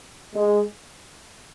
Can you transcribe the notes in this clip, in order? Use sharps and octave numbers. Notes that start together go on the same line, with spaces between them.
G#3